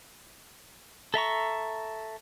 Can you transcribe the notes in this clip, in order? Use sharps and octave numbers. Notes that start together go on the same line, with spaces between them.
A4 E5 A#5 C#6